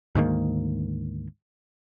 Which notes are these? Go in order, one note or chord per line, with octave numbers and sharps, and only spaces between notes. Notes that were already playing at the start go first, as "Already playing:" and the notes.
D2 G#2 D#3 A#3